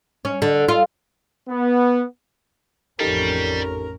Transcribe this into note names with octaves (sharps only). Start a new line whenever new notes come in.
C#4
D3
F4
B3
A1 F2 G3 C#4 D#4 G4 A4 A#4